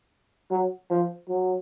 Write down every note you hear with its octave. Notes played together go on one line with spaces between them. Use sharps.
F#3
F3
F#3